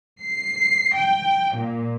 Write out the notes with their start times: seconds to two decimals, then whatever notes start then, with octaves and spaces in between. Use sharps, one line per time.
0.23 C7
0.97 G5
1.58 A#2